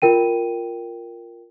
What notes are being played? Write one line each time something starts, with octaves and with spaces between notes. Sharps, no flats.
F4 A#4 G5 D#7